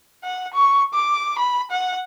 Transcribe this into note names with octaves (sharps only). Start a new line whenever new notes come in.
F#5
C#6
D6
B5
F#5